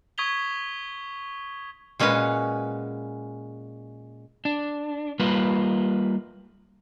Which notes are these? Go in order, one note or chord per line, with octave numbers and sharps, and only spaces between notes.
C#6 D#6 G#6 B6 F7 G7
A#2 G#3 C#4 F#4 B4
D4
G3 A#3 F4 B4